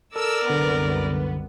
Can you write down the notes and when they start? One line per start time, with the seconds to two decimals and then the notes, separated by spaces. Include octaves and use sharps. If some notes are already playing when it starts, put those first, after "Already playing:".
0.16 A4 A#4 D5 E6
0.50 C2 F#2 D3 B3